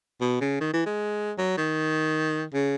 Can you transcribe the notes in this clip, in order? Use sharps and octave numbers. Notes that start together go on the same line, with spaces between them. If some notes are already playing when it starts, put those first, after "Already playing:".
B2
C#3
D#3
E3
G#3
F#3
D#3
C#3